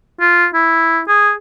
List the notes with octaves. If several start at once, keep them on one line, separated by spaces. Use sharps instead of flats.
F4
E4
G#4